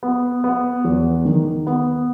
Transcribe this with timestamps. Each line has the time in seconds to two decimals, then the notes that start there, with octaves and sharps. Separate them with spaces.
0.03 B3
0.44 B3
0.84 E2
1.25 D#3
1.67 B3